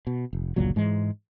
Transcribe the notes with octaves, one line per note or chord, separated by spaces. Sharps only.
B2
F1
G1 C#2 A#2 F#3
G#2 E3 G#3